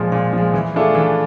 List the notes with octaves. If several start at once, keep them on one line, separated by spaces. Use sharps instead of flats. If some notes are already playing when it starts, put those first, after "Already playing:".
Already playing: A#2 F3 G#3
A#2
F3 G#3
E3
A3 D4 F4 G#4
E3